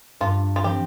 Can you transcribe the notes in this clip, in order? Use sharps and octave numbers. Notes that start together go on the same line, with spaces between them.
G2 F4
F4
F3 C4 G4